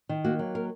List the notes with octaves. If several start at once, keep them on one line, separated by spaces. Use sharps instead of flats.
D#3
A#3 F#4
F#3
A#4